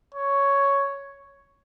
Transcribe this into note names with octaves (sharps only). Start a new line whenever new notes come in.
C#5